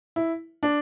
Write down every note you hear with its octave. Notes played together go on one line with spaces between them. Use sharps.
E4
D4